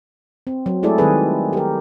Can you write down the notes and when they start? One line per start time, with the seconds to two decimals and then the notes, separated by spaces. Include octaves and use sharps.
0.47 C4
0.66 F#3
0.83 G#3 A3 E4 G#4 A4 D5
0.98 D#3 F#3 G3 C4 G#4 B4
1.53 G4 A#4